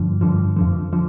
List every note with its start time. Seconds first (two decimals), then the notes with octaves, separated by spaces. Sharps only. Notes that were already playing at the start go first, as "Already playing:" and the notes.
Already playing: G2 D3 F3
0.21 G2 D3 F3
0.56 F2 D3 F3
0.93 D3 F3